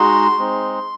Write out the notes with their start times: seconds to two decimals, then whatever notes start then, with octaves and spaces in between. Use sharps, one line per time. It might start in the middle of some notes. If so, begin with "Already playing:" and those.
Already playing: G#3 D#4 F#4 C6
0.38 G#3 C4 D#4